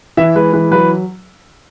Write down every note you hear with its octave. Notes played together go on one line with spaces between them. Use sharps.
E3 E5
G#3 B4
E3 B4
F#3 B4